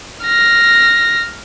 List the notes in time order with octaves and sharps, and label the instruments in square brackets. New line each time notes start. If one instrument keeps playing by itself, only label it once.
[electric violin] F6 A#6